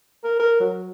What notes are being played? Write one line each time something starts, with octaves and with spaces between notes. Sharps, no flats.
A#4
A#4
F#3